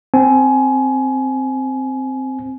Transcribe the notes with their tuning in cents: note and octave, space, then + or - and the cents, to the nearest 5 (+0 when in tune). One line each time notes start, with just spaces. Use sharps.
C4 +0 G#5 +25